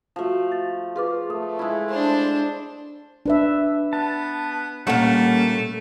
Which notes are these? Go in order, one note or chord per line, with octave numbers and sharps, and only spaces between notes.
F3 A3 F#4 A5
C#6 A6
F4 G#4 B4 D6
A3 D#6
G#3 E4
D4 C5
D4 B4 E5
B3 A5
A#2 G3 A3 A#3 C#4 F#5